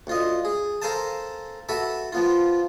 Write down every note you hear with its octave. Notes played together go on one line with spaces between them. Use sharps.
D2 F4 D#5
G#4
A4 A#4 C5 F5 G#5 A5
F#4 A4 B4 E5
F3 B3 F4